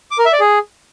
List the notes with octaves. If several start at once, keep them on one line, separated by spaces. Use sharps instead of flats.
D6
A#4
E5
D5
G#4